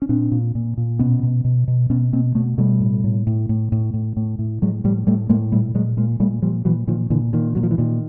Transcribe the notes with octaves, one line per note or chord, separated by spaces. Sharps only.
C#4
A#2 C4 D4
A#2
A#2
A#2
B2 B3 C#4
B2
B2
B2
B2 B3 C#4
B2 A#3 C4
B2 A3 B3
B2 G3 A3
A2
A2
A2
A2
A2
A2
A2
A2
A2 F#3 G#3
A2 F3 G3
A2 G3 A3
A2 G#3 A#3
A#2 G3 A3
A#2 F#3 G#3
A#2 G#3 A#3
A#2 G3 A3
A#2 F3 G3
A#2 E3 F#3
A#2 D#3 F3
A#2 D3 E3
A#2 D#3
A#2 F#3
F3
E3
A#2 D#3